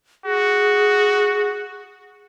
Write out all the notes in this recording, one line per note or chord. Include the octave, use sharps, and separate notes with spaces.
F#4 G#4